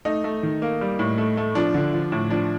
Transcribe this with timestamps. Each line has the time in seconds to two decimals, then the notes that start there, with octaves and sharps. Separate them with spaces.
0.05 A3 D#4
0.24 A3
0.43 D#3
0.62 A#3
0.81 G3
0.99 A2
1.18 A3
1.37 A3
1.55 F3 D4
1.74 D3
1.93 F3
2.12 A2
2.30 F3 D4